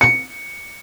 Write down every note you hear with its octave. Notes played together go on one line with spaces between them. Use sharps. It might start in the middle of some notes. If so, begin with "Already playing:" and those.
C#7